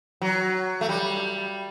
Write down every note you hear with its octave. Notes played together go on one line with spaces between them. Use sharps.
F#3
A3
G3